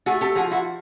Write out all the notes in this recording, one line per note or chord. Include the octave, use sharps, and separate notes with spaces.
A3 F#4 G#4
G4 A4
F3 F#4 G#4
E4 F#4